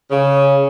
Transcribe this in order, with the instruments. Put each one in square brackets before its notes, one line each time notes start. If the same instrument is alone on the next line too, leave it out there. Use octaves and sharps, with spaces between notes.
[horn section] C#3